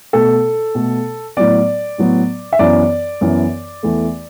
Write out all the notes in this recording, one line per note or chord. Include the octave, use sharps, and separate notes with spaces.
B2 A3 A4
B2 A3
A2 F#3 B3 D5
A2 F#3 B3
E5
F#2 E3 B3 D5
F#2 E3 B3
E2 E3 A3